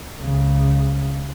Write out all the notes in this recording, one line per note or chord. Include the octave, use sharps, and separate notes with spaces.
C#2 C#3